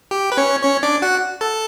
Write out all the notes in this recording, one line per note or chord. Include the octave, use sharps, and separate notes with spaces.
G4
B4
C#4 C#5
C#4 C#5
D4 D5
F#4 F#5
A4 A5